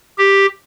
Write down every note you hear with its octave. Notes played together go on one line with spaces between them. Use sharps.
G4